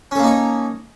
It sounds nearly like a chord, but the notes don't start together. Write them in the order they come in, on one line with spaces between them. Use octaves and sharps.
C#4 A4 A#3 D#4 C#5